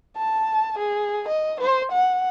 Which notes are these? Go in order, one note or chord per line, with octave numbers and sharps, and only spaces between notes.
A5
G#4
D#5
C5
F#5